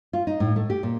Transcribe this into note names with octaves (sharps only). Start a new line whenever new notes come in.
F4
D#4
A2
A3
G4
A#2